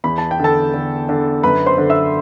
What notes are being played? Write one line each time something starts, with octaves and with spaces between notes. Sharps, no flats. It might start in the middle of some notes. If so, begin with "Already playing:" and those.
E2 B5
A5
G5
D3 A4 A5
D3
D3
F#2 B4 B5
C5 C6
D3
E5 E6